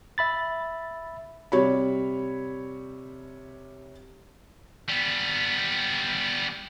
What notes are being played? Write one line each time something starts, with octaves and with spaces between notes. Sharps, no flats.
E5 B5 A6
C3 G3 C#5 B5
G3 B3